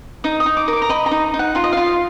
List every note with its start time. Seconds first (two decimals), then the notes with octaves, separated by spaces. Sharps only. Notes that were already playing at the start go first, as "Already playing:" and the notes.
0.24 D#4 D#6
0.40 D#6
0.46 D#4
0.57 D6
0.68 A#4
0.73 D6
0.82 A#5
0.89 D#5 B5
1.06 A#5
1.11 D#4
1.34 D#4
1.39 F#5
1.55 F4 F5
1.64 D#5
1.73 F4 F5